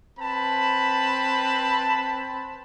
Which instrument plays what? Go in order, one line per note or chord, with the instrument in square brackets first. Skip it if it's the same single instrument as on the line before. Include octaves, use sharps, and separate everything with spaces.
[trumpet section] C4 B4 A5 B5